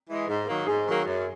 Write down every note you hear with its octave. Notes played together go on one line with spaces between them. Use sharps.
E3 G#3
G#2
D#3 F#3 A#3
G#2 G#4
D#3 F#3 A#3
F#2